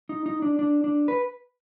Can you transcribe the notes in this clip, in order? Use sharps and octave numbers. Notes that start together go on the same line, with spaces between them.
D#4
D#4
D4
D4
D4
B4